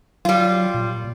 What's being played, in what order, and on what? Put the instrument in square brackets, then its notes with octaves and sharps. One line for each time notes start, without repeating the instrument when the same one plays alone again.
[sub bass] F#3 [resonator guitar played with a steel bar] G3 F4
[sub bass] A#2